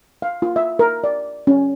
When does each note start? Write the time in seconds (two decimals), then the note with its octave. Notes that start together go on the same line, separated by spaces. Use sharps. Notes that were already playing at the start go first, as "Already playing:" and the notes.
0.22 F5
0.42 F4
0.56 E5
0.79 A#4
1.04 D5
1.47 C#4